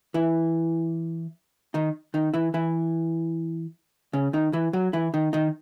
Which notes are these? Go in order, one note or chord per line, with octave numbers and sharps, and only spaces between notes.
E3 E4
D#3 D#4
D#3 D#4
E3 E4
E3 E4
C#3 C#4
D#3 D#4
E3 E4
F#3 F#4
E3 E4
D#3 D#4
D#3 D#4